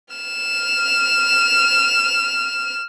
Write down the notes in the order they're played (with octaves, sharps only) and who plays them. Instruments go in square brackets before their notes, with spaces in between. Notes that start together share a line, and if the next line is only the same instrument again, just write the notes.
[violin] F6 E7